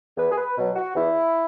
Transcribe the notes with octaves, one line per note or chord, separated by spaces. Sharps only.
E2 B4
G#4
B4
B2 F#3
F#4
E2 E4